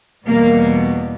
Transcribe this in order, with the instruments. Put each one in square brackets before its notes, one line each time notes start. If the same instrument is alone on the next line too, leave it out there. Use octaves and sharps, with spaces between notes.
[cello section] E2 B2 G3 A#3